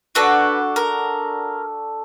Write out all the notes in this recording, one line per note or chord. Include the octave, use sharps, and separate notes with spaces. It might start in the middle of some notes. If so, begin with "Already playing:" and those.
D4 F#4 A4 B4
A#4